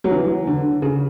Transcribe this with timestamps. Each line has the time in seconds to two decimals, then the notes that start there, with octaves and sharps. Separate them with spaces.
0.04 F#3
0.11 E3
0.47 D3
0.82 C#3